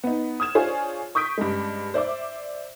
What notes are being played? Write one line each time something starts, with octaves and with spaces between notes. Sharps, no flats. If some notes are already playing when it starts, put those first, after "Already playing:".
B3 D#4
D#6 F6 G#6 E7
D4 F4 G#4 C5 C#5
C#6 D#6 G6 B6 D7
G2 C#3 G#3
C5 D5 E5 D6